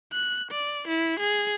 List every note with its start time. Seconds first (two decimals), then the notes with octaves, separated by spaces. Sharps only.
0.13 F#6
0.51 D5
0.88 E4
1.19 G#4